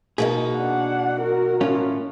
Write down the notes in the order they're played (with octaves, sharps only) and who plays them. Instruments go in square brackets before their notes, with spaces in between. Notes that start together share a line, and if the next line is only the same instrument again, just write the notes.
[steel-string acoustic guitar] B2 A#3 D#4 [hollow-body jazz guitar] G#4
[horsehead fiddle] D4 F#5
F#4 A#4
[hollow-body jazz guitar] A2 C#4 F4